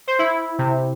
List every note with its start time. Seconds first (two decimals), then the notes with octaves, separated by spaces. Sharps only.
0.07 C5
0.19 E4
0.59 C3